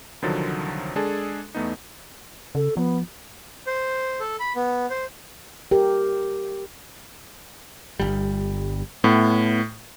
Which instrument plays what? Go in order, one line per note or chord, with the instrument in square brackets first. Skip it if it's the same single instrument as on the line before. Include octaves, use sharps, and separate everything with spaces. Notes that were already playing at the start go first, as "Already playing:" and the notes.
[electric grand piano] C2 D3 D#3 F3 F#3 A6
G#3 D4 G#4 A4
E2 A3 B3 D#4
[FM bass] C#3 [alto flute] A4
[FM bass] F3 [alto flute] B3
[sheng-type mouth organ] C5
A4
B5
B3
C5
[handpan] G4 A#4
[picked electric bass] G1 G3
[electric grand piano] A2 [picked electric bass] B3